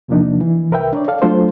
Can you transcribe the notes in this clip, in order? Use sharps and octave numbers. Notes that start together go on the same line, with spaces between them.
E2 C3 F3 A#3 D4 D#4
E3
C2 A#4 B4 E5 G5
D4 C#5 D5
A4 D5 F5
F#3 A3 D4 F4 A4 C5